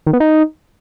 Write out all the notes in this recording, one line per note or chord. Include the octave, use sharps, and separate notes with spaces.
D#3
B3
D#4